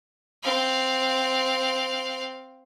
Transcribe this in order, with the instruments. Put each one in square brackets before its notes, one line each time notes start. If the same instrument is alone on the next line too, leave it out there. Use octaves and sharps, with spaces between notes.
[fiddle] C4 F5